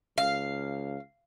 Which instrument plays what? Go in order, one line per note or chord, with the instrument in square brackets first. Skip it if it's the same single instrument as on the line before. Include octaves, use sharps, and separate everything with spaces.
[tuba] C#2 [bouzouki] F5